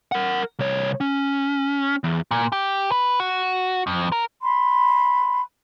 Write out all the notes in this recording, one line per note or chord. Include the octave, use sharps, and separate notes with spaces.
A#4 F#5
C2 C#5
C#4
E2
A#2
G4
B4
F#4
F2
A#4
B5 C6